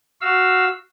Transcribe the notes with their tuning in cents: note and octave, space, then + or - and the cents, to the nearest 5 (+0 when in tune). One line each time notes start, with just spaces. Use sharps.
F#4 +0 F5 +0 E6 +0